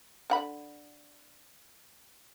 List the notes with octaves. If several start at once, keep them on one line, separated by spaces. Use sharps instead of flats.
D3 F#5 B5